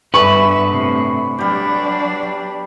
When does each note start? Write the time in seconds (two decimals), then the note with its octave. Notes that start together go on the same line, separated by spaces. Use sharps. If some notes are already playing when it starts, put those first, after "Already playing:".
0.14 G2 D3 E3 B3 B4 E5 C#6
0.71 A2 C3
1.38 F#3 G3 D4 G4